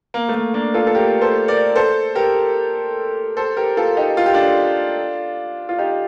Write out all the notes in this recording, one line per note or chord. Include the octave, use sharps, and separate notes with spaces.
A#3
A3
A#3
A#3 D4
F4 A4
A4
G4 A#4
A4 C5
A#4 D5
A4 C5
G4 A#4
A4 C5
G4 A#4
F4 A4
D#4 G4
F4
G4
D4 F4
F4
D#4 G4